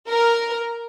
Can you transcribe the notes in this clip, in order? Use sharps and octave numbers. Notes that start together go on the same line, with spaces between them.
A#4